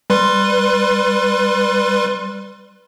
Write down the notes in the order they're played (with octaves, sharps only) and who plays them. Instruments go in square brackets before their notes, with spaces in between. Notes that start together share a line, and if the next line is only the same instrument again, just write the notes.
[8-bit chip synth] G3 B4 C6